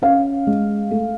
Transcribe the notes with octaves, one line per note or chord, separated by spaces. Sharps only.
C#4 F5
G#3
A3